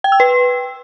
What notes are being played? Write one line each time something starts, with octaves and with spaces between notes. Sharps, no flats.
G5
E6
B4